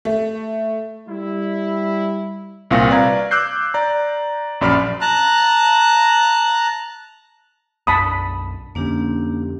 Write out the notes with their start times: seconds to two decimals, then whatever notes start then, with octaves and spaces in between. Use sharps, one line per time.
0.05 A3
1.08 G3 E4
2.71 C2 A#2 C4 F5 C#6 A#6
2.90 B4 D5 F5 A#5 G#6
3.31 D6 E6 F#6 G6 C7
3.74 D5 A#5
4.61 A#1 F#2 D5 B5 F6
5.01 A5 A#5 F#6
7.87 B1 F#2 D4 A5 B5 D#6
8.75 F2 D3 A#3 C#4 D4 G4